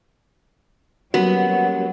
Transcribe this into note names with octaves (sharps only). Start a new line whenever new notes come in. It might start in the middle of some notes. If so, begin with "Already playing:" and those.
F#3 G3 A#3 B3 C#4 F#4